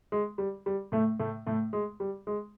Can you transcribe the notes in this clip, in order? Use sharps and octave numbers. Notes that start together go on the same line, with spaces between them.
G#3
G3
G3
A2 A3
A2 A3
A2 A3
G#3
G3
G#3